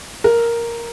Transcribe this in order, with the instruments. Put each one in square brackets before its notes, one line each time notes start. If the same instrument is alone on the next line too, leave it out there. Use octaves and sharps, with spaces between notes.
[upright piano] A#4